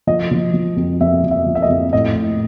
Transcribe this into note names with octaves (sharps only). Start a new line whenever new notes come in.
F3 D#5
F3
F3
F2
F2 E5
F2
E5
F3
E5
D#5
F2
A2 D#5
A2